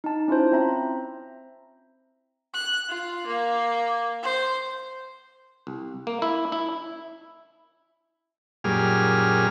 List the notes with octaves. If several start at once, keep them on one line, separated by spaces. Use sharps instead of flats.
D#4 A5
C#4 E4 F4 C5
C4 E5 A#5
F#6
F4
A#3
C5
C2
A#3
E4
E4
F#2 A#2 G3 G#4 F6